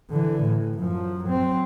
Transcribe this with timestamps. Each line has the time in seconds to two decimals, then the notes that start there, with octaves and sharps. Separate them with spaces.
0.11 D3 E3
0.42 A2
0.79 F#2 F3
1.24 F#3 C4